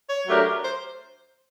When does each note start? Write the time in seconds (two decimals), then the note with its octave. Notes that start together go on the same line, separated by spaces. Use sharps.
0.09 C#5
0.27 F#3 A3 D4 G4 A#4
0.64 C5